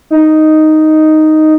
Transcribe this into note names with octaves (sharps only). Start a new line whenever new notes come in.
D#4